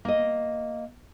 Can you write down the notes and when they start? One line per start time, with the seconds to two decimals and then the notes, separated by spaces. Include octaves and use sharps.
0.05 A#3 D#5